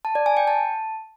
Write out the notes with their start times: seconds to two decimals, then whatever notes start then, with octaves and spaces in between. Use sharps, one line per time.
0.05 A5
0.15 D5
0.26 G#5
0.37 G5
0.47 A5